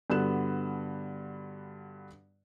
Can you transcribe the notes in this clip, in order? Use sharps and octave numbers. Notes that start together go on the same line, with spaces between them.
G2 D3 B3 F#4 F#6 E7